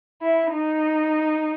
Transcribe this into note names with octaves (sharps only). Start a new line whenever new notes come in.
E4
D#4